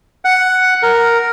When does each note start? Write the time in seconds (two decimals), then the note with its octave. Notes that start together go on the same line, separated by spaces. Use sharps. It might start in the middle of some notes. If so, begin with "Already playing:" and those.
0.25 F#5
0.83 A#4